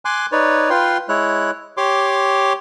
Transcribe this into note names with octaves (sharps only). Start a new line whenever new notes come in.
G#5 C6 D6 F#6
D#4 B4 C#5 D5
F4 B4 G5 C6
G#3 E4 C#5 F#6
G4 C#5 C6 D6